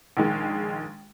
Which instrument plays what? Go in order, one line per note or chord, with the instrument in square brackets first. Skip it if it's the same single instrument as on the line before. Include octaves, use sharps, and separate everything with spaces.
[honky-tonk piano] A#1 D#3 G#3